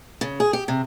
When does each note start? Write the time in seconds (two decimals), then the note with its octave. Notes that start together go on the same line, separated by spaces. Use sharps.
0.21 C#3
0.40 G#4
0.53 G4
0.68 C3